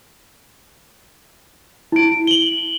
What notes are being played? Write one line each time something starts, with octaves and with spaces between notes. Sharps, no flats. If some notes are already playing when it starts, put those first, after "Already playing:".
E4 D7
F#7 G7